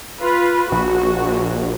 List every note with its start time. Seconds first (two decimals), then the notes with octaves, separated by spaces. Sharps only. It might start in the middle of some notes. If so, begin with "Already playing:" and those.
0.21 F4 B4
0.72 A#1 F#4